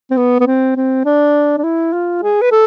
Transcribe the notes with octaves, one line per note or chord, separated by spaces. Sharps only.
C4
B3
B3
C4
C4
D4
D4
E4
F4
G#4
B4
A4